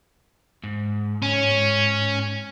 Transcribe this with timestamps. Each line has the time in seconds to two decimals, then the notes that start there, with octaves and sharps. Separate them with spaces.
0.63 G#2
1.22 C#4